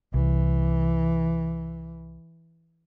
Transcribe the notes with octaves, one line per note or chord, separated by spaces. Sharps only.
C2 E3